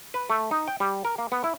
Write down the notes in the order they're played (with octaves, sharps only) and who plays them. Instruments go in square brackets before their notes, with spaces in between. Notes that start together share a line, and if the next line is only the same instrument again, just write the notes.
[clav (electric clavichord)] B4
A3
D#4
G5
G3
A#4
A#3
B3
E4